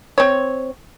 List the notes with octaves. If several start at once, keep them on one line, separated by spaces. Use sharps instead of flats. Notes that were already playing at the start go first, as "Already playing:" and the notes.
C4 C#5